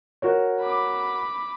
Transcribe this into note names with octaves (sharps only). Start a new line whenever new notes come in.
F#4 A#4 C#5
B5 D6